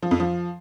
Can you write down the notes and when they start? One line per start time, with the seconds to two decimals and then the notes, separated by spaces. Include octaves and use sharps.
0.03 F3
0.11 F2
0.20 F3